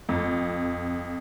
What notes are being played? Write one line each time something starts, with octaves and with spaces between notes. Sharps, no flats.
F2